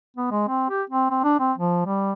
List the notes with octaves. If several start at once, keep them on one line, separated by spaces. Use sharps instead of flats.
B3
G#3
C4
G4
C4
C4
D4
C4
F3
G3